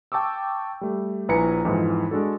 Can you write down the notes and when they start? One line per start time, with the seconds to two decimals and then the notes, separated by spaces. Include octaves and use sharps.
0.12 G5 A5 C#6 D6 E6
0.81 G3 A3
1.29 A#1 E4 B4 G#5 A#5 C#7
1.65 F2 G#2 E3 G#3
2.11 G#3 D4 F#4 A4